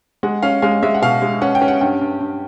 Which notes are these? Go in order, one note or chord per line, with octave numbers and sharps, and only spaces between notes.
G#3 F#5
C#4 F5
G#3 F5
G#3 E5
F#5
B2 F5
G#3
C#4 F#5
G5
C#4
F#5
G2 G5
G2
G2